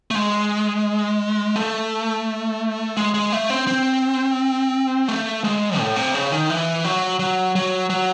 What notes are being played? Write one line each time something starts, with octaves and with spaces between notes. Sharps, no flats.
A3
G#3
A3
G#3
G#3
A3
C4
C4
A3
G#3
A2
C3
C#3
D#3
E3
F#3
F#3
F#3
F#3